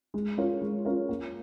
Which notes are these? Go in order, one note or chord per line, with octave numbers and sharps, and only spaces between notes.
G#3
C#4 F4 A#4 C#5
G#3
C#4 F4 A#4 C#5
A#3